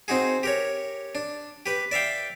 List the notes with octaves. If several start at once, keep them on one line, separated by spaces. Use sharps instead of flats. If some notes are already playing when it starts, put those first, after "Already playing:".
C4 D#4 F#4 G#4
G4 A#4 C#5
D4
G4 B4
D5 E5 F5 G5